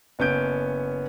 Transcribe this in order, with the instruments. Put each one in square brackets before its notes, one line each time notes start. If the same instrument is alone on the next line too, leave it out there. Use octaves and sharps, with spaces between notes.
[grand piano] F#1 B3 C#4 G6 D7